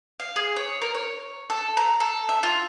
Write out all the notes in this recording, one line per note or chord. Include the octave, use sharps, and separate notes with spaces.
F5
G#4
C#5
A#4
C#5
A4
A#5
A4
E5
F4